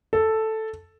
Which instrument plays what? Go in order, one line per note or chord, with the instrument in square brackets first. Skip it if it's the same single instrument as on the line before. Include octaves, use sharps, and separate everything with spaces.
[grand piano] A4